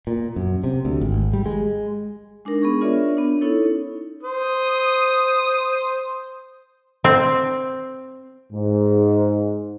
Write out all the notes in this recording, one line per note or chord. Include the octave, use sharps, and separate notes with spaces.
A#2
F#2
C3
D2
G#1
G3
G#3
G#3 D4 D#4 A#4
B3 G#4 C#6
D4 F4 A#4 C#5 D5 E5
B3 D4
C#4 D#4 E4 A4 C#5
C5 D#6
C4
G#2